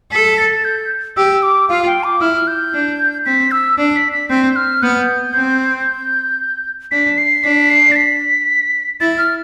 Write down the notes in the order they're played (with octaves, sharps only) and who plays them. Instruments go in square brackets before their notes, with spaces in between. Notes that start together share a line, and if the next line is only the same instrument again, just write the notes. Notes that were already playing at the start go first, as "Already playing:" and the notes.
[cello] A4 [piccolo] B6
[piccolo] A6
G6
[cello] G4 [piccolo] E6
[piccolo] D6
[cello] F4 [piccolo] F5
[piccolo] G5
D6
[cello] E4 [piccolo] F6
[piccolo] G6
[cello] D4
[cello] C4 [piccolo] B6
[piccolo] E6
[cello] D4
[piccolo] B6
B6
[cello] C4 [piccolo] G6
[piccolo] F6
[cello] B3 [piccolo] G6
[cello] C4
[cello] D4 [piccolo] B6
[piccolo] C7
[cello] D4 [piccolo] B6
[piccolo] C7
A6
B6
[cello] E4 [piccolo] A6
[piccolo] F6